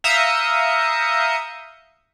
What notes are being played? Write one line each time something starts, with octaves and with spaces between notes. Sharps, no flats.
E5 F5 A#5 D#6 G6 C#7